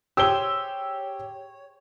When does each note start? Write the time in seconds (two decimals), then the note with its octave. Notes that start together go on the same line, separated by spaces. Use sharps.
0.17 G4 G#4 C5 C#5 G5 E6 G7